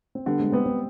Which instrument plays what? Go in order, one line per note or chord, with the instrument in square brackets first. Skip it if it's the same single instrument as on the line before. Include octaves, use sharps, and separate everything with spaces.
[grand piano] C4
[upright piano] D3 [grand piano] G3 B3
[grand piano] G#3 C4
[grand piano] G#3 C4 [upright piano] B3
[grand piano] G#3 C4